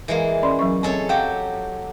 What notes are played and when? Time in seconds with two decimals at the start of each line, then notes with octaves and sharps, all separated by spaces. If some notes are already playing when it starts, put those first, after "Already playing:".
0.08 E3 G#3 A#3
0.43 C#4 D5 C6
0.59 F#3 C#4 C#6
0.83 G#3 C4 A4 C#5
1.09 F#3 G4 F5 G5